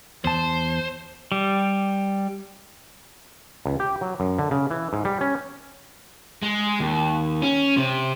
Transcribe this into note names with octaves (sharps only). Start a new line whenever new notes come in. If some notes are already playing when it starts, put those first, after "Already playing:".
E2 C5 A5
G3
C#2
G4
F#3
F#2
D3
C#3
E3
G#2
G3
C#4
G#3
D#2
C#4
C3